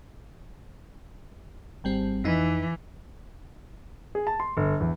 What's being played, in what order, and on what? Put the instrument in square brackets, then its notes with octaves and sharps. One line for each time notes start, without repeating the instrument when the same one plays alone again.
[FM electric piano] G#1 G3 C4
[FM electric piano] F2 D#4 [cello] E3
[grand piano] G#4
A5
C6
G1
E2